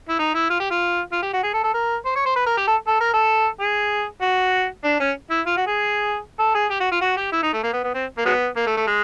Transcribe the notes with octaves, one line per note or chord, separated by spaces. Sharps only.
E4
D#4
E4
F4
G4
F4
F4
G4
F#4
G#4
A4
A4
A#4
C5
C#5
C5
B4
A#4
G4
A4
A4
A#4
A4
G#4
F#4
D4
C#4
E4
F4
F#4
G#4
A4
G#4
G4
F#4
F4
F#4
G4
E4
D#4
A3
A#3
B3
B3
C4
A#3
F#3 G#3 B3
A#3
A3
A3
G#3